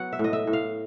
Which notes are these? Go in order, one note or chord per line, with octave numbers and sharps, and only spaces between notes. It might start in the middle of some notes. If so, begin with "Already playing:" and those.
Already playing: F#3 B3 F#5
E5
A2
D#5
E5
A2
F5